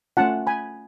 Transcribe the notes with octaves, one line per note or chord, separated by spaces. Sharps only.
A3 C#4 F4 F#5 A5
G#5 B5